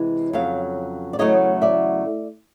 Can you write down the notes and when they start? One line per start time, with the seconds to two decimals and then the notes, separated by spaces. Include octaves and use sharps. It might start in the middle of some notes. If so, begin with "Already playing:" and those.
Already playing: C3 E3 G#3
0.33 F2 C#3 F#3 F5
1.13 D5
1.19 E2 C#3 F#3 A3 C#5 D#5
1.62 D5 E5